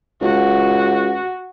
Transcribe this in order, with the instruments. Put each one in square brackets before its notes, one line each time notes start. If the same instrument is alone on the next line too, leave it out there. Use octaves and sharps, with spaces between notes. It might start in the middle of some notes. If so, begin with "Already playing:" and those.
[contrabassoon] C#2 [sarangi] F#4